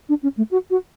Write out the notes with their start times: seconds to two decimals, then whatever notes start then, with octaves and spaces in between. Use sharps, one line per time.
0.09 D4
0.23 C#4
0.37 A3
0.51 F#4
0.70 F#4